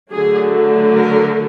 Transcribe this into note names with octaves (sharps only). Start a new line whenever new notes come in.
D3 F#3 A3 G#4
A#4